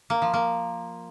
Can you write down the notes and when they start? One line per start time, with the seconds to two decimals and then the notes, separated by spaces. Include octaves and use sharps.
0.10 A#3
0.22 F3
0.34 A#3